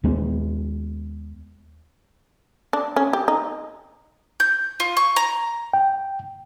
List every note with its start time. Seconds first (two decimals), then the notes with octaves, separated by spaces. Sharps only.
0.04 D#2 G#3 B3
2.73 D4
2.96 C#4
3.13 G4
3.28 D#4
4.40 G6
4.80 F4
4.97 C#6
5.16 A#5
5.73 G5